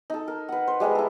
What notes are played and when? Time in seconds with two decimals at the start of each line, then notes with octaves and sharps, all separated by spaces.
0.10 D#4 A4
0.28 A#4
0.49 B4 F#5
0.67 C5
0.80 G3 G#3 A#4 B4
0.95 E4 A4